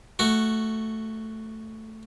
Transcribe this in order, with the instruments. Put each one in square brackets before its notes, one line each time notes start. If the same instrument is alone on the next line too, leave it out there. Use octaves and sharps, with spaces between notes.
[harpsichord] A3 F#4